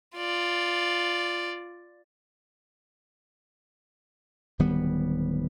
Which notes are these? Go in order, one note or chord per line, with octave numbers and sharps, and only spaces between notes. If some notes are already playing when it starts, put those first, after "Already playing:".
F4 D5
D1 D#3 G3 B3